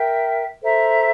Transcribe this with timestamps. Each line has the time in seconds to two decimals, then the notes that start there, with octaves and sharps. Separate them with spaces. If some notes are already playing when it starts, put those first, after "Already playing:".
Already playing: A#4 E5 G5
0.61 A4 C5 E5 A#5